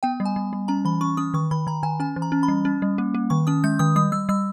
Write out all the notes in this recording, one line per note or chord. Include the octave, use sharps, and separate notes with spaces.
B3 G5
G3
G#5
G3
G3
C#4 A#5
E3 B5
C#4 C#6
C#4 D#6
D#3 C#6
D#3 B5
D#3 A#5
D#3 G#5
C#4 G#5
E3
A#5
C#4
B5
G3
C#4
G3
A#3
A#3
D#3 C#6
C#4 D#6
G#3 G6
D#3 D#6
G3 D#6
G3 E6
G3 E6